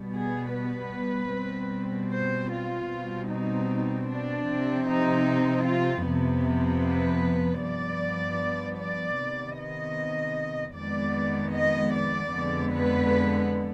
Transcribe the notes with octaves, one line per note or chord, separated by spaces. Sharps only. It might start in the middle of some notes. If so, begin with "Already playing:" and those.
Already playing: B2 G3 B3
G#4
B4
B2 G3 C4
C5
F4
B2 G3 C4
D#4
D4
C3 F3 C4
D#4
F4
F2 C3 F3 B3
B4
G2 F3 B3 D5
D5
C3 D#3 B3
D#5
F2 D#3 G#3 B3 D5
D#5
D5
F2 D3 G#3 B3
B4